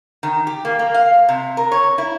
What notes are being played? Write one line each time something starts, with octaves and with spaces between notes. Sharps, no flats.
D#3
G4
A#3
A#3
F5
C3
A#4
C#5
E4